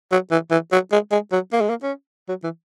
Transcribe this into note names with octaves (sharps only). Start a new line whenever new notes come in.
F#3
E3
E3
F#3
G#3
G#3
F#3
A#3
G#3
A#3
C#4
F#3
E3